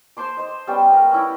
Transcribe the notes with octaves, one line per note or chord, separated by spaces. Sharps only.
C5 A5 C6 D6
C5 D#5
G3 B3 C#4 G4
B3 A#4
C#4 E4 D5